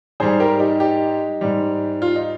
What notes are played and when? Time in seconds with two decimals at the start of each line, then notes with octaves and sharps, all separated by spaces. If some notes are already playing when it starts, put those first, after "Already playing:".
0.20 G#2 G3 G#4 C5
0.40 G4 A#4
0.60 D#4 G4
0.80 D#4 G4
1.41 G#2 G3
2.02 F4
2.16 D#4